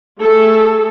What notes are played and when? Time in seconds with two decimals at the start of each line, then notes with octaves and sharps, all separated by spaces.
0.21 A3 G#4 A4